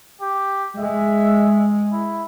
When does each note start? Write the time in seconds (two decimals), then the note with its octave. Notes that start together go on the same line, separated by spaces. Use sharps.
0.21 G4
0.79 G#3 E5
1.93 E4